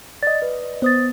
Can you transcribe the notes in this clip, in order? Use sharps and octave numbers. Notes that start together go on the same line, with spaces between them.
D5 D#5 A6
B4
B3 C5 D#6 A6